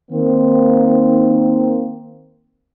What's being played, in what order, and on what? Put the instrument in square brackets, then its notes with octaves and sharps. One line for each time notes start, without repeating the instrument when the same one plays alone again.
[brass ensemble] D#3 A#3 C4